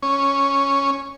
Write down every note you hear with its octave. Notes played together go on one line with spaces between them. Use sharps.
C#4